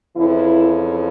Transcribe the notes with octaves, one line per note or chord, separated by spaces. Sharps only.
F2 C#3 E3 E4